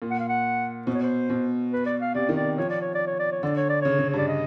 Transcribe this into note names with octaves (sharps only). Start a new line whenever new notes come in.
A#2
F#5
F5
F#5
B2 C5
C#5
C5
B2
B4
D5
F5
C3 D5
D#3
D5
F3 C#5
D5
C#5
D5
C#5
D5
C#5
D3 D5
C#5
D5
C#3 C#5
C#3
G2 C#5
D5
D#5